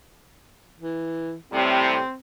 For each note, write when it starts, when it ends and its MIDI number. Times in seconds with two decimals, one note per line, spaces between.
0.79 1.34 52
1.52 1.98 45
1.52 1.98 48
1.52 1.98 55
1.52 2.16 60